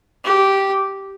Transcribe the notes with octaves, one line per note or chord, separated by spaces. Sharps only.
G4